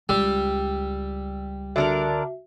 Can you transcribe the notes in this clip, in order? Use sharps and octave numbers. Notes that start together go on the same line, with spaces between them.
C#2 G3 E6
D3 D4 F#4 A#4 E5